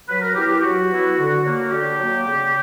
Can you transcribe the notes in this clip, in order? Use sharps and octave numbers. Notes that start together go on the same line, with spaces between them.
F#3 B4
A#4
B3 E4 G4
G4
F#3 F#4
B3 E4
D3
F#3 A#3
D3 G4
F#3 A#3
C#3